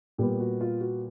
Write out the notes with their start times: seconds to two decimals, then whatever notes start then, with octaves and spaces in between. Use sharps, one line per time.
0.18 A#2 G3 B3 G4
0.40 F#4
0.61 F4
0.81 F#4